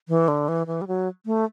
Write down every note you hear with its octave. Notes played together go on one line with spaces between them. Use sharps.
E3
D3
E3
E3
G3
F#3
A3